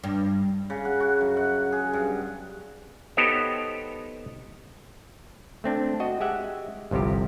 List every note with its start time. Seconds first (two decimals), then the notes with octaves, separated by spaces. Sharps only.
0.04 G2
0.70 C#3
0.85 F#5
1.00 F#4
1.21 F#2
1.37 F#5
1.72 G#4
1.93 G2
3.17 B3 D#4 G4 A4 C5 C#5
5.64 A3 C4 D4
6.00 F#4 D#5
6.20 G#3 G4 E5 F#5
6.91 G1 C2 C3 F3 G4